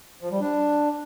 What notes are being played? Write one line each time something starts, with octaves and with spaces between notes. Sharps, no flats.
F3
G3
D4